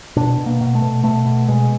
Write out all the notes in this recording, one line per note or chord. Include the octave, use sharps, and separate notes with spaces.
B2 D4
B2
A#3
B2
A3
B2
B2 A3
B2
B2 G#3